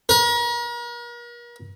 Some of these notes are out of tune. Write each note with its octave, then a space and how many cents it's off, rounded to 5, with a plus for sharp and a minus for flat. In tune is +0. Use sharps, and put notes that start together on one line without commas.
A#4 +40